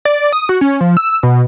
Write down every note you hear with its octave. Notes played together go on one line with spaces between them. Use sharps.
D5
D#6
F#4
C#4
F3
E6
B2